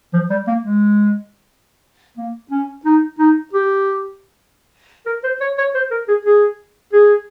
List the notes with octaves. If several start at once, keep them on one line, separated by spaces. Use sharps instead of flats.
F3
G3
A#3
G#3
A#3
C#4
D#4
D#4
G4
A#4
C5
C#5
C#5
C5
A#4
G#4
G#4
G#4